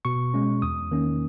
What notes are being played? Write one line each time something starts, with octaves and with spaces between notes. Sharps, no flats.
B2 C#6
G#3 C#4
E2 D#6
D#3 A#3 C#4